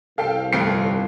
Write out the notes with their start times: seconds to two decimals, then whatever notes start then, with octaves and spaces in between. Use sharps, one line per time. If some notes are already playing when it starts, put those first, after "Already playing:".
0.18 C2 A4 F5 G5 C7
0.53 G1 F2 A3 F4 G5 C7